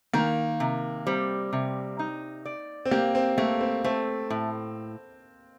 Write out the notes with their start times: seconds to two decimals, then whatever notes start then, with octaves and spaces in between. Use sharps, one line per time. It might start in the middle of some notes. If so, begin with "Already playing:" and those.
0.14 D#3 A#3
0.60 C3
1.06 G3 C4
1.53 C3
1.99 D#4
2.45 D5
2.85 C4
2.91 A#3 G4
3.15 C4
3.38 A3 A#3
3.61 C4
3.84 A3 C4
4.30 A2